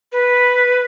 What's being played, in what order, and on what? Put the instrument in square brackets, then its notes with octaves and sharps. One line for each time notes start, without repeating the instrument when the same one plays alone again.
[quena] B4